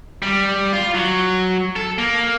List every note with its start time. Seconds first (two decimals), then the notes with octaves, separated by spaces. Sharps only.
0.22 G3
0.73 F4
0.95 F#3
1.76 A4
1.98 A#3